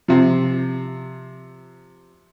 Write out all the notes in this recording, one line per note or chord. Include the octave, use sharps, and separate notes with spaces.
C3 F3